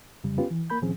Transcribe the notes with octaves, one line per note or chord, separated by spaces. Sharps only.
F2 C#3 G3
B3 C#4 F4 G4 B4
E3
A#3 A#4 B5 G6
A2 D#3 F3 C4 C#4 G#4